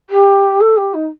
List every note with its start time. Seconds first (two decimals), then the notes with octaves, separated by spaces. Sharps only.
0.10 G4
0.60 A4
0.77 G4
0.94 D#4